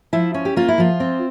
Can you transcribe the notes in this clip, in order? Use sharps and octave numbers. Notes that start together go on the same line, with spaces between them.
F3 E4
C#4
G4
A#3 F4
E4
F3 F4
C4